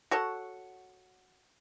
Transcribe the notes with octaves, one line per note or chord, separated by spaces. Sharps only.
F#4 A4 C#5 F#5